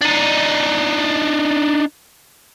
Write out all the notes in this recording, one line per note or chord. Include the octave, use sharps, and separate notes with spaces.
D4 D#4